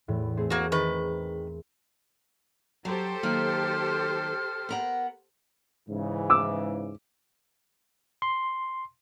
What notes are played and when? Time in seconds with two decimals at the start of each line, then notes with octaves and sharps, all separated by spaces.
0.08 E2 A2
0.37 A3 C4 G#4
0.50 A#3 F#4 E5
0.72 D#3 A#4 B4
2.85 F#3 G4 A4 C5
3.23 D#3 F#3 A#3 F6
4.69 B3 A#4 F#5
5.88 G#2 C#3 E3
6.30 D6 E6
8.22 C6